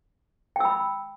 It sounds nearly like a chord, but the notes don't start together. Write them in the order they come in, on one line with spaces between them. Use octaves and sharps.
G5 E6 B5